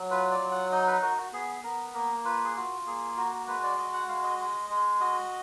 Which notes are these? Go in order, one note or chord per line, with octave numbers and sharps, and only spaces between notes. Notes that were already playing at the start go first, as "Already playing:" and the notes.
Already playing: F#3
F4 B4
D5
F#3
F#5
D#4 D#5
B4
F#4 A#4
F#4
B3 G#4
B3 A#4
A#3 A#4
F4 B4
G#4
F4 F#4
A#3 G#4
F#4 A#4
A#4
G#3 B4
D5
F#4 D#5
F#5
G#3 F5
D#5
G#3
G#3
F#4 D#5